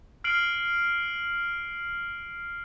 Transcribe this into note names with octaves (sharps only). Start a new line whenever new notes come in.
F6 C7 D7 F#7